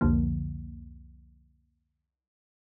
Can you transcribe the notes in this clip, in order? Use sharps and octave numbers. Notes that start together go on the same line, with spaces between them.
C2 F2 D3 F3 A#3